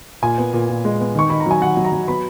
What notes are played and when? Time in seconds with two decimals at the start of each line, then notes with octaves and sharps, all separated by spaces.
0.22 A#2 G#5
0.38 B3
0.53 A#2
0.69 A#2
0.85 G#3
1.00 B3
1.15 D#3 C#6
1.30 D#3 B5
1.40 A#5
1.46 F#3 G#5
1.61 D#3 F#5
1.77 F#3
1.84 A#5
1.92 F#3
2.08 B3 B5